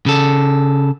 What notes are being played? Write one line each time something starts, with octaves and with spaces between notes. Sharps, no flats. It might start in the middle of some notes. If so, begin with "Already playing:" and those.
C#3 A4